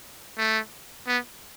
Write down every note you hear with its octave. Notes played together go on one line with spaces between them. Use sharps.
A3
B3